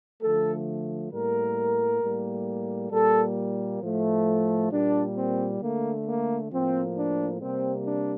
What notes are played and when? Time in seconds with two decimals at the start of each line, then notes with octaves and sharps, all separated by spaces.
0.22 D3 F3 A3 A4
1.12 A2 G3 A#3 A#4
2.02 A2 G3 A#3
2.91 A#2 G3 A#3 A4
3.82 A2 F3 A3
4.71 A#2 G3 A#3 D4
5.16 C4
5.61 D3 A3 A#3
6.06 A#3
6.51 A2 F3 A#3 C4
6.96 D4
7.41 C3 G3 A#3 C4
7.85 D4